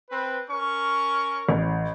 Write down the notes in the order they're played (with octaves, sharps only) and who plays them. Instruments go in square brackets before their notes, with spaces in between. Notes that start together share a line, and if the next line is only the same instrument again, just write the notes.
[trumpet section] C4 B4
C#4 A#4 C#6
[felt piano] A1